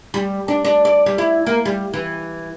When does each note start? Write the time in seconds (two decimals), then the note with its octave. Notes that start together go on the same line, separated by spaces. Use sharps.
0.14 G3
0.48 D4
0.65 D4
0.85 D5
1.06 G3
1.18 E4
1.46 A#3
1.65 G3
1.94 E3